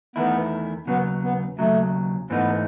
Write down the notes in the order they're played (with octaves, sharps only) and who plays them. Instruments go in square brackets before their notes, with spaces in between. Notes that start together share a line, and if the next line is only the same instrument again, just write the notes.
[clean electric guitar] E2 D#3 A3 E4 [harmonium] B3
[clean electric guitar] D#2 C#3 F#3 [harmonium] B3
[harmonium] B3
[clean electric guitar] D#2 C#3 F#3 [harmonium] A3
[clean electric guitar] G#2 E3 A3 D#4 [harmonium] B3